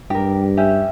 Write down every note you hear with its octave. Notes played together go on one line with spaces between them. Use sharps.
G2 G4 A#4
C#4 G4 E5